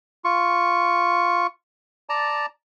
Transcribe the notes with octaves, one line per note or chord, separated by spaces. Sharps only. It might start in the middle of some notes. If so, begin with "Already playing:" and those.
F4 C#6
D5 A5 A#5